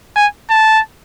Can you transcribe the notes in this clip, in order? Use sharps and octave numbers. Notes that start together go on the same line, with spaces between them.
G#5
A5